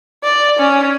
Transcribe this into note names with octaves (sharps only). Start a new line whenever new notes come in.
D5
C#4